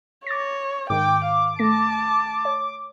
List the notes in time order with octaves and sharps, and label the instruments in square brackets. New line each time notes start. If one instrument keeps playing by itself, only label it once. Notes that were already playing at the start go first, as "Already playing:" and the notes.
[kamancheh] C#5 [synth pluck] D6 A6 A#6
[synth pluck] G#2 D#3 [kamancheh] G5 [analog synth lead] D6
[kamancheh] F5
[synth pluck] A3 A#6 [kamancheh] A5
[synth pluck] C#5